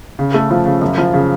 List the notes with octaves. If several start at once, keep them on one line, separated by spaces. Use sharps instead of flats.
C#3
A3
F3
C#3
F#2
F3
C#3